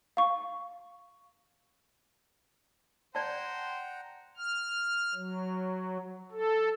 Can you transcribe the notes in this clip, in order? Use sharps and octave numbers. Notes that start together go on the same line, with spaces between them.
F5 C#6
C5 D5 F#5 G5 A5 A#5
F6
F#3
A4